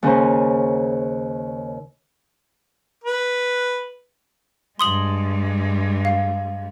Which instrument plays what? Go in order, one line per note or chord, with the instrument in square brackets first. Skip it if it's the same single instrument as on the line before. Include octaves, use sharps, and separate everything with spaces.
[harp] D#2 C#3 C#4 C5 A#5
[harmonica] B4
[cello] G2 G#3 [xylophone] C6 D#6 F#7
[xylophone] F5